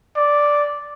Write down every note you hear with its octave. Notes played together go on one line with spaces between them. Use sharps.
D5